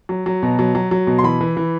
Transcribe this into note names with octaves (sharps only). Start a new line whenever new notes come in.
F#3
F#3
B2
F#3
F#3
F#3
B2
C6
E3 B5
E3
E3